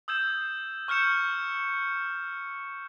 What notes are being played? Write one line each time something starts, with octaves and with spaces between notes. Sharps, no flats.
D#6 E6 G6 G#6 E7
C#6 F6 G6 C#7 E7